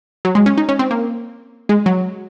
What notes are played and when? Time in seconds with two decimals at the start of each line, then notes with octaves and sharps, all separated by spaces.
0.25 F#3
0.35 G#3
0.46 C#4
0.58 D#4
0.69 C#4
0.79 C4
0.91 A#3
1.69 G#3
1.86 F#3